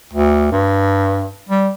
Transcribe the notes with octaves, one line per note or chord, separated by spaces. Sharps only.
D2
G2
G3